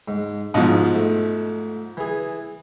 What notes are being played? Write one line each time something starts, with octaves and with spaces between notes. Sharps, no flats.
G#2
G#2 B2 F3 D#6
A3
E3 G#4